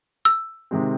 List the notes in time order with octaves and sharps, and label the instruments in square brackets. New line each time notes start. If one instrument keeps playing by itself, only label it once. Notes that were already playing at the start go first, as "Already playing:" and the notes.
[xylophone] E6
[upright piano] C3 D#3 G#3 C4